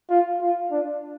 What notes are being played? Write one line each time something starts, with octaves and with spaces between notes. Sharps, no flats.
F4
F4
D4